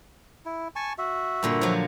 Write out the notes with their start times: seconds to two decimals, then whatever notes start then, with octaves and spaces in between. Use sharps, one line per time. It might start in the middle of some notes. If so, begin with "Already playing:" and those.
0.45 E4
0.76 G#5 A5 C#6
0.98 F#4 E5
1.43 G2 A#2 D3
1.61 F3 F#3